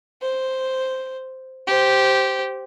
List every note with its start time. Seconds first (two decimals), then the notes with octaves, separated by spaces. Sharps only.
0.22 C5
1.67 G4 C5